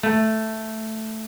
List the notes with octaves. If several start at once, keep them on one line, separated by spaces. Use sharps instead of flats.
A3